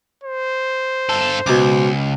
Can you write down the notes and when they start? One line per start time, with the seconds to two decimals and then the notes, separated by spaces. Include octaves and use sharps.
0.24 C5
1.09 G2 A4
1.46 C#2 B2 D6